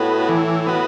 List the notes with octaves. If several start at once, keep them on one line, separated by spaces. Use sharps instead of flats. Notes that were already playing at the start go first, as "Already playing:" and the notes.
Already playing: A2 B3 F#4
E3
B3 F#4